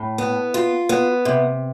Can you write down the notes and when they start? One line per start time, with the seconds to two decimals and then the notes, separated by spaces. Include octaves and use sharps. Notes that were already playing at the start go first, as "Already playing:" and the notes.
Already playing: A2
0.18 B3
0.54 F4
0.89 B3
1.25 C3